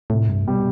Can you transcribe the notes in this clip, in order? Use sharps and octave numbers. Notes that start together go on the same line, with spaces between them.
C2 A2
G2
B2 G3